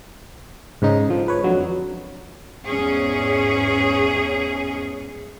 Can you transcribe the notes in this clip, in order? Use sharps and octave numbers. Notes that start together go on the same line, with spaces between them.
G#2 C#3 D#4
D3 F3
B4 C#5
F2 D3 F#3
E2 G#2 C#4 G#4